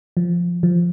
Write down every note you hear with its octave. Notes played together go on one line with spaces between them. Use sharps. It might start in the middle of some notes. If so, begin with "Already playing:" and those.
F3
F3